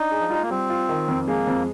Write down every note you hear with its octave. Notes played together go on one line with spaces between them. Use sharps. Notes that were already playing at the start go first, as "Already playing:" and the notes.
Already playing: D4 D#4
G#4
F3
G3 F4
G#3
A#3
G3 C4
F4
D#3
F2
G#3 A#3
F2